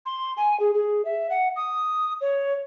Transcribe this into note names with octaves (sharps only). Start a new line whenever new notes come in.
C6
G#5
G#4
G#4
E5
F#5
D#6
C#5